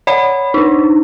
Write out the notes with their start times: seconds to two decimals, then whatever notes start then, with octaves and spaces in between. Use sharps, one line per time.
0.07 C#5 D5 F#5 B5
0.54 D4 D#4